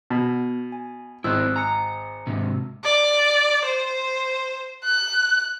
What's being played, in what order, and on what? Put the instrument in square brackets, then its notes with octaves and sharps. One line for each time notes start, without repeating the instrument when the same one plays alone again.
[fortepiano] B2 [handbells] B3
[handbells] G#5
[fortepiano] G#1 [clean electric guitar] C4 E4 [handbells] E6 F#6
[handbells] G#5 C#7 [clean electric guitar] A#5
[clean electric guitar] G#2 C3
[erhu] D5
C5
F#6